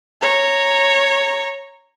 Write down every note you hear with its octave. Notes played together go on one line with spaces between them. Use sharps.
C#5 A#5